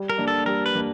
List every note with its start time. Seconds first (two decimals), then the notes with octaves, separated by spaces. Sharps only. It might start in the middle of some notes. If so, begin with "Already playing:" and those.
Already playing: G3
0.10 A#4
0.18 A#3 D4
0.28 A4
0.46 G3 A#4
0.66 B4
0.75 A#3 D4